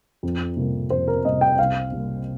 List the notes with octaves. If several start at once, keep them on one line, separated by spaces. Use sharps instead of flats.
F2
C3 G3 A#3
F2 C5
A#4
C3 G3 A#3 D#5
G5
C2 F5
C3 G3 A#3